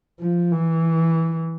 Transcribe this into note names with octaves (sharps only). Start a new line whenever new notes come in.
F3
E3